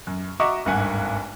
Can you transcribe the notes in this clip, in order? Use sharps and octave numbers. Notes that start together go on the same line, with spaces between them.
F#2
F#4 D#5 E5 A#5 C#6 D6
D1 G#1 G2 F#5 G#5